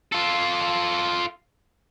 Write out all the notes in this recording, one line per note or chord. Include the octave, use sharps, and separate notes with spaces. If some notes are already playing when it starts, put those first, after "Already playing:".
F4 A4